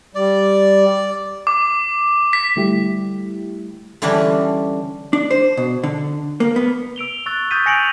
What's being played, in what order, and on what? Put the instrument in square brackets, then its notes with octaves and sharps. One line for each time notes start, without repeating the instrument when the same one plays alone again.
[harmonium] G3 [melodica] D5
[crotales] D6
B6
[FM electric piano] D3 G3 A3 E4 G4
[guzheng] D3 E3 G3 C#4 D4
[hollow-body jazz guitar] D4
C5
B2
D3
A#3
B3
[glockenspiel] E6 D7 F7 G7
C#6 E6 F#6 A6
C#6 D#6 G6 A6 B6 D#7
G#5 A#6 C#7 D7 F7 F#7